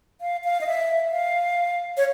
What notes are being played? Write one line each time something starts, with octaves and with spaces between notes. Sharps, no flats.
F5
F5
D#5
E5
F5
C#5